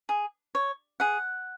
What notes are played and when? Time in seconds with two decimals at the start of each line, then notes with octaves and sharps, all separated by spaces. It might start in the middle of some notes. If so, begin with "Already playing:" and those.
0.09 G#4
0.55 C#5
1.00 G#4 F#5